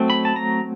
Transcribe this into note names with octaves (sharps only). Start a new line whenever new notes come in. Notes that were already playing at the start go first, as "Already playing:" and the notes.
Already playing: F#3 A3 C4
B5
A5
A#5